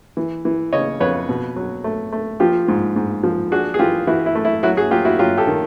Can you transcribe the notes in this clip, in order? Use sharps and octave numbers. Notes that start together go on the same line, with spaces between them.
E3
E3
C#3 C#5 D#5
F2 B4 C#5
B2
F#3
A3
A3
F3 F4 G4
G#2
G#2
F3
D4 F#4 G#4
G#4
E3 F4 G4
E3 E4 F#4
E4
A3
E4
F#3 E4 F#4
F#4 G#4
F#3 F4 G4
E4 F#4
F#3 F4 G4
G4 A4
D#3